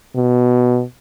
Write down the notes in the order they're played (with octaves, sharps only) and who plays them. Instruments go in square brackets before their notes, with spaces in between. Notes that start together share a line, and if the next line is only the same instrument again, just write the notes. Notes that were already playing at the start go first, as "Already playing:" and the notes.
[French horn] B2